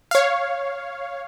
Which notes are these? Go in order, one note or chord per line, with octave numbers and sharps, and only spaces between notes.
C#5 F5